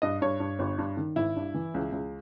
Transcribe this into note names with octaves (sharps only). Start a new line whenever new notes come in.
G2 D#5
G2 C#5
G2
G1
G2
D#3
G#1 E4
G2
E3
C#2
C#2